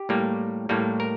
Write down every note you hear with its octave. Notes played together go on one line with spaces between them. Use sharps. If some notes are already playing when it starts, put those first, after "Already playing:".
Already playing: G4
A2 G3 A#3
A2 G3 A#3
A#4